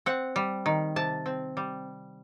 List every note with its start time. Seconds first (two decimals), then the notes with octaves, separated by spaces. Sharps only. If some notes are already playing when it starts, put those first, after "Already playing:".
0.06 C4 F#5
0.36 G3
0.66 D#3
0.96 C3 A5
1.26 C4
1.57 G3